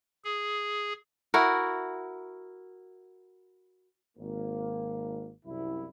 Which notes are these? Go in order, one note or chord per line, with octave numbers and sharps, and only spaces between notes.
G#4
E4 F#4 A#4
G#1 A#3
C2 F#2 E4